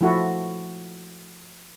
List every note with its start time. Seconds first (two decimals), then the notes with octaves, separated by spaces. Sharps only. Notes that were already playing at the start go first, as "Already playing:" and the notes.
0.01 F3 A3 E4 F#4 A4